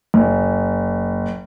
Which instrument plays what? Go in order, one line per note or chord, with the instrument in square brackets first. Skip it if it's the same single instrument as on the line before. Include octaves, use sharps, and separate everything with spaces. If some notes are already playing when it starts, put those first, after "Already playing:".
[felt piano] F#1